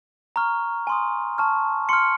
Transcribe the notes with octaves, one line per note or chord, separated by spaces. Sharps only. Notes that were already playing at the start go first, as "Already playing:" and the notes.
A#5 C#6 F6
G#5 C6 D#6
A5 C#6 F6
C6 F6 C#7